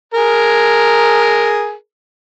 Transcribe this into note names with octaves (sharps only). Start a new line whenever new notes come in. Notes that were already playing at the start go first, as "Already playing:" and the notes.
G#4 A#4